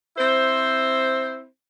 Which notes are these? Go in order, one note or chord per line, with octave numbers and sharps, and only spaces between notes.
C4 E4 C5